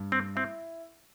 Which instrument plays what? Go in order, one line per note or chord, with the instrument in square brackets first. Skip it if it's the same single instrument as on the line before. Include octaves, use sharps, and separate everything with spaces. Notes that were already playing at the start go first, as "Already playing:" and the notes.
Already playing: [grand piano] G2
[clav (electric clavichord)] C4
[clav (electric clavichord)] C4 [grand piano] E4